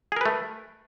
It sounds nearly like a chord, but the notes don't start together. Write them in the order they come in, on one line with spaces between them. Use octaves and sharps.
G#4 A#4 B4 A3